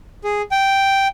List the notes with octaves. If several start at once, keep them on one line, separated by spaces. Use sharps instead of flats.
G#4
G5